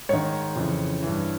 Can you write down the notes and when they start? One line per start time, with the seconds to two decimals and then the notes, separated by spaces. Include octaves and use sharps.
0.09 G#2 D#3 C#5
0.56 F2 C#3 E3
1.03 G2 E3